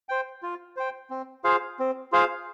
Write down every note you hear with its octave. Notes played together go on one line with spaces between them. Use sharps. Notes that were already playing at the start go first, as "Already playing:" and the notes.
C5 G5
F4
C5 G5
C4
F4 G#4 C5 F5
C4
F4 G#4 C5 F5